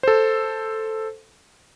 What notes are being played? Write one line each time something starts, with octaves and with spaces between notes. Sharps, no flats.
A4 C5